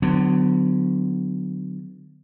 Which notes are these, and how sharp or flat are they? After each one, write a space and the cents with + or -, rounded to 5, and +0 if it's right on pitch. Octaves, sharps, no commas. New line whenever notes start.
D3 +25 F#3 +0 B3 +35